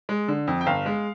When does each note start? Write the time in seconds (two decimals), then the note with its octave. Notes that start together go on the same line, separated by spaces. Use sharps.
0.09 G#3
0.28 D3
0.47 F2
0.61 G5
0.66 G1 F5
0.86 G#3